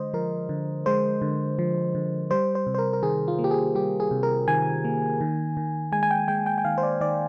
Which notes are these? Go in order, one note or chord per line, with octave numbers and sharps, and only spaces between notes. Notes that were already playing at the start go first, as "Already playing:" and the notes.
Already playing: D3 G#3 C5 D#5
F3 A#4
D3
G#3 C5
D3
F3
D3
G3 C5
C5
C3
C5
A#4
A#4
D#3 G#4
F4
A#3
G4
G#4
G3 G4
G#4
C3
A#4
D#3 G#5
A#3
D#3
D#3
G#3 G#5
G#5
G5
G#3 G5
G5
G5
D#3 F5
C5
D5
D#3 D5